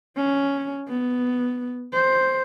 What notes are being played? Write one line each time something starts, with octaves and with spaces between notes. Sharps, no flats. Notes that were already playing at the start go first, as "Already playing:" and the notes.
C#4
B3
C5